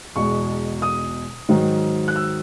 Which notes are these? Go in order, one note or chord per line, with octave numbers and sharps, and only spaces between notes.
E2 B2 G#3 C#6
D#6
G#2 D#3 F#3
F#6
E6